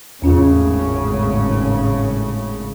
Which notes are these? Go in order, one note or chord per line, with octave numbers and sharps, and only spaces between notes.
G#1 E2 A2 C#3 C#4 F4